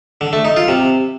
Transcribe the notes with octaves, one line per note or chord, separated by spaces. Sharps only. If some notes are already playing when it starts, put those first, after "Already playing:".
D3
A3
D#4
F4
C3